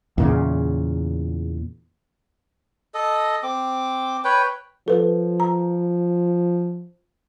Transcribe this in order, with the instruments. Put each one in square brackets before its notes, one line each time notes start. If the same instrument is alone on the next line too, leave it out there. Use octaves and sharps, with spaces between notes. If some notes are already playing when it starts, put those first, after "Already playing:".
[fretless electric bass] E2 A#2 C#3
[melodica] A4 D#5
C4 D6
B4 C#5 G5
[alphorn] F3 [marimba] A4 B4
[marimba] A#5